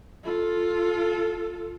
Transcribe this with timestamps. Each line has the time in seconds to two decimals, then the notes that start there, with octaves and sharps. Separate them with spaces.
0.24 F4 A4